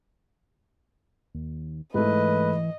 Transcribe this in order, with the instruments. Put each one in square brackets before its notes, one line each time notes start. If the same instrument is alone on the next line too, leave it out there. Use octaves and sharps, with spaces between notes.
[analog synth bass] D#2
[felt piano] G#2 A3 [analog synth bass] E3 [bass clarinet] B4 [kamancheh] D#5